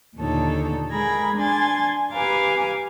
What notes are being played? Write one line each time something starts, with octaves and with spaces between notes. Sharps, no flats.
D#2 A#2 D3 D#4 A4 C#5
G#3 G#4 A#4 B5 G#6 A#6
D4 G#5 C6 G#6 A6
G4 B4 F5 G#5 A#5 D6